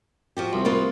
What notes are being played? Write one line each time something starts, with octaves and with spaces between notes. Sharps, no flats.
F3 F#4 G4
C2
A#3 B3 F4